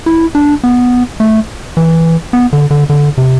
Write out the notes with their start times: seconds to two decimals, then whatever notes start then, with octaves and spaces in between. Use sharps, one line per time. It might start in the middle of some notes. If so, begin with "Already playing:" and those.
0.06 E4
0.35 D4
0.64 B3
1.20 A3
1.77 E3
2.33 B3
2.53 D3
2.71 D3
2.90 D3
3.18 C3